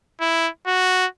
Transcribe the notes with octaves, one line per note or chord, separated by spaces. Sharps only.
E4
F#4